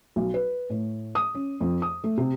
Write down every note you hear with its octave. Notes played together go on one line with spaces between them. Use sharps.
B1
B4
A2
D#6
C#4
F2
D#6
A3
C3